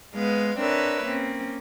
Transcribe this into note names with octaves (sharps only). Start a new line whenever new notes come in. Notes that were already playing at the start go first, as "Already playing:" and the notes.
G#3 B3 F5
C4 D4 A#4 B4 C#5 E5
A#3 C4 C#4